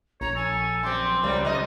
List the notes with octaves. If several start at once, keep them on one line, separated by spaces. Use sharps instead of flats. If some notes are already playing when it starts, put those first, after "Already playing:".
A#1 C#5 A#5
A4 G#5
F#2 C4 G4 C6
C#2 F#3 G3 C4
C#3 G4 D#5